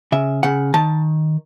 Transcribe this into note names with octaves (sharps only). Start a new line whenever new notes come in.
C#3 E5
C#3 F#5
D#3 A5